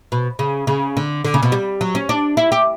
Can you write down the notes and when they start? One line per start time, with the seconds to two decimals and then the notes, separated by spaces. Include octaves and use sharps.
0.12 B2
0.39 C#3
0.67 C#3
0.97 D3
1.25 D3
1.34 C#3
1.43 B2
1.52 G3
1.81 F#3
1.95 C#4
2.09 D4
2.37 E4
2.52 G4